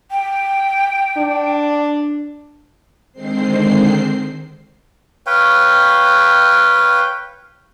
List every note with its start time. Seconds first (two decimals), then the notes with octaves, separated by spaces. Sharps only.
0.11 G5
1.17 D4
3.12 D3 D#3 G#3 C4 C5 C7
5.26 B4 C#5 F5 G5